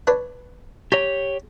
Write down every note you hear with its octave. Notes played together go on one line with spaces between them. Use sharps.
D4 B4 C#5
G4 C#5 G#5 A#5 C#6